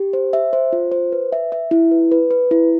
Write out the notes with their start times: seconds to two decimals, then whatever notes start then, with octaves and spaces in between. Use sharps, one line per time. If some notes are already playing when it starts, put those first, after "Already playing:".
Already playing: G4
0.13 C5
0.33 E5
0.53 C5
0.73 F4
0.92 C5
1.12 B4
1.32 E5
1.52 E5
1.71 E4
1.91 B4
2.12 B4
2.30 B4
2.51 E4